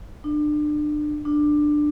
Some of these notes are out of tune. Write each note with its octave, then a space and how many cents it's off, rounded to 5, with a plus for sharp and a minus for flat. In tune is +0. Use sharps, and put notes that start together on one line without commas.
D4 +30
D4 +15